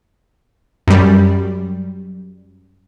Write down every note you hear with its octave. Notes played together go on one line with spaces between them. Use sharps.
F#2 G3